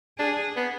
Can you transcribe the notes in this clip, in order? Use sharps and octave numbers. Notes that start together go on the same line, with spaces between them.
D4 G#4
B3